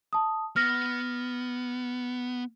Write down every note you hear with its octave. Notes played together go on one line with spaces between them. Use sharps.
A5 D#6
B3 F6 A#6